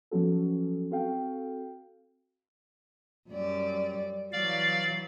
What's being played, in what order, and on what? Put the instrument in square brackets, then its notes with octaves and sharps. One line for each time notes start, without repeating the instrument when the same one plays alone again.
[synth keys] F3 F#3 B3 C#4 F#4 A4
C4 F#4 A4 F5 G5
[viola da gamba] F#2 G3 D5
[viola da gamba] E3 F#3 [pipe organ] D5 F5